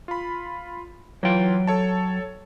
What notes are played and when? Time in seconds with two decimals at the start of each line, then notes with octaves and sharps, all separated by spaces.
0.08 F4 B5
1.23 E3 F#3 F4 G5
1.67 A4 C#5 A5